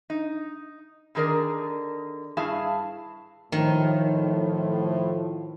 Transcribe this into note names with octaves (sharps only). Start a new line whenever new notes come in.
D#4
D3 D#3 G#4 A#4 D5
G2 E4 G#4 F5 A5
A2 D#3 F3